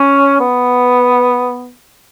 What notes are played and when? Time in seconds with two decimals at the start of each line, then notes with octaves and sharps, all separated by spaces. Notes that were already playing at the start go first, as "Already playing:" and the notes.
Already playing: C#4
0.39 B3